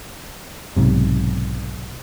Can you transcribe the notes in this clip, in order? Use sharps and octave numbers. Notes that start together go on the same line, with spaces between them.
B1 G#2 C3